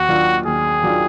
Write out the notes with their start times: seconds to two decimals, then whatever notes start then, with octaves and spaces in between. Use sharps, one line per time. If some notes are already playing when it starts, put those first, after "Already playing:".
Already playing: D#2 F#4
0.09 D#3 F#3 D4 F4
0.46 D#2 G#4
0.83 D#3 F#3 D4 F4